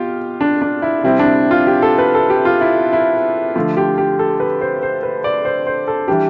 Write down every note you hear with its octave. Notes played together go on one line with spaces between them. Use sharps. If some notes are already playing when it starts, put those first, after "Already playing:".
Already playing: B2 F4 G4
D4
D4
E4
C3 G3 C4 E4
D4
F4
G4
A4
B4
A4
G4
F4
E4
E4
D3 F3 A3 F4
G4
G4
A4
B4
C5
C5
B4
D5
C5
C5
A4
E3 G3 D4 G4